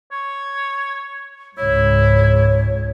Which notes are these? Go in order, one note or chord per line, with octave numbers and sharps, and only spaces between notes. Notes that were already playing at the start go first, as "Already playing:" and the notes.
C#5
C#2 G#2 E4 C#5